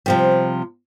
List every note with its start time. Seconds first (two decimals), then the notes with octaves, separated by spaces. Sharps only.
0.06 C3 F3 G3